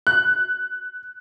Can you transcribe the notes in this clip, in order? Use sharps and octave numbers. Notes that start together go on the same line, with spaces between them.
F#6